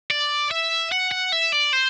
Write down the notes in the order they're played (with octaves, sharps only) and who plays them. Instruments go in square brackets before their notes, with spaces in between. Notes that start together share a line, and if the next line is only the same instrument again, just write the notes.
[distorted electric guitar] D5
E5
F#5
F#5
E5
D5
C5